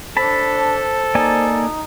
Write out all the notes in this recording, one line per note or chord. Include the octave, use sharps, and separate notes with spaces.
D4 A4 C5 A5 B5
A#3 D#4 D5 G#5